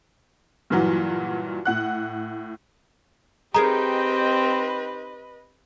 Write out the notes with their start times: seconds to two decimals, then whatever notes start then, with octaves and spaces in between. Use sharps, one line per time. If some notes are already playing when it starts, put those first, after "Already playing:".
0.70 G2 A#2 E3 F#3
1.65 A2 F#5 F#6
3.54 C4 D#4 G4 G#4 A#4 B4 D#5 A#5